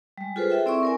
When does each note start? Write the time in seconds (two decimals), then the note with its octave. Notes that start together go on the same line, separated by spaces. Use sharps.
0.18 G3 G#3
0.36 F4 F#4 G#4 A4 B4 C5
0.50 G#4 A4 E5 G5
0.66 C4 E4 D5 E5 C6 C#6
0.83 A#4 D5 G#5